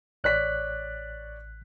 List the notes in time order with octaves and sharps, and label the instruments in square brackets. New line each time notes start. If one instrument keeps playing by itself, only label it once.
[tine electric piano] A1 F#6 [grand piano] C#5 D5 B6